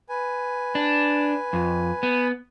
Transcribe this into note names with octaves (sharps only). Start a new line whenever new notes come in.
B4 G#5
D4
F2
B3